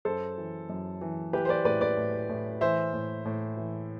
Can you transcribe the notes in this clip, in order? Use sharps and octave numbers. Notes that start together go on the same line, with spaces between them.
F#2 A4 C5
E3
F#2
E3
E3 G4 B4
C5
B4 D5
A2 B4 D5
B4 D5
A2
A2
E3 C5 E5
A2
A2
E3